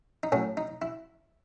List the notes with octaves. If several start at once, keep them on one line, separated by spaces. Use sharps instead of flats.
D#4
A2 F#3 A3 C#4
D#4
E4